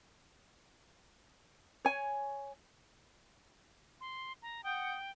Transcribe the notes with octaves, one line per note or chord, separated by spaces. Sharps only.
C#5 G#5
C6
A#5
F#5 G5 D#6 G6